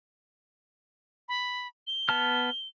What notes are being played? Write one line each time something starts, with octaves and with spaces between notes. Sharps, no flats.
B5
G7
B3 A5 F6